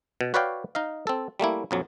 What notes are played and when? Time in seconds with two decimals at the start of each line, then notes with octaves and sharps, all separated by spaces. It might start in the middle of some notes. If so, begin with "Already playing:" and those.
0.21 B2
0.34 F#4 B4 C#5 D5 F5 G5
0.75 D#4 D#5 F5
1.07 C4 A4
1.40 G3 A3 A#3 E4
1.71 A#1 F2 F#3